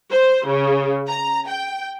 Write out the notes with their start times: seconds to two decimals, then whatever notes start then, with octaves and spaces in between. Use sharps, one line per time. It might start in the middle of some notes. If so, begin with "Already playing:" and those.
0.11 C5
0.47 C#3
1.09 A#5
1.48 G5